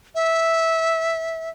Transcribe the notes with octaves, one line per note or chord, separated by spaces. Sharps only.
E5